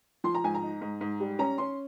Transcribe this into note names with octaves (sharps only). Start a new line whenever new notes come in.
F3 C6
A#5
G#2 G#5
A#5
D#4
G#2
G#2
G3
C#4 A#5
C#4 C6